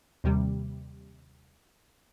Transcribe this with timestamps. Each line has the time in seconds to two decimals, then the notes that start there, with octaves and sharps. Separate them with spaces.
0.24 D#2 C3 G3